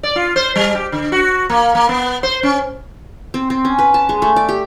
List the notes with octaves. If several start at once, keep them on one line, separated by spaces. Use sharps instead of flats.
D5
F4
C5
G3
G4
D3
F#4
A#3
A#3
B3
C5
C#4
C4
C4
C#4
B4
A5
G#3
A3
D5
G4